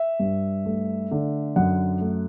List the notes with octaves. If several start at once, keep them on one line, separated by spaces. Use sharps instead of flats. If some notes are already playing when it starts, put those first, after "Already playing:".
Already playing: E5
G2
A3
D3
F#2 F#5
A3